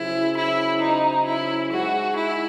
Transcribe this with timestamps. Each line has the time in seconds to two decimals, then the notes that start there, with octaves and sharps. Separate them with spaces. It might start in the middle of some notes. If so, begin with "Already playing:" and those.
Already playing: C#3 F#3 C#4 E4 G#4 C5
0.36 E4
0.80 D#4
1.25 E4
1.70 G#3 D#4 F#4 G#4
2.14 E4